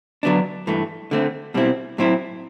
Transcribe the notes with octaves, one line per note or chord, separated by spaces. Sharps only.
D3 F#3 B3 D4
G2 E3 A3
D3 A3 C4
B2 G3 C4 E4
A2 F#3 C4 E4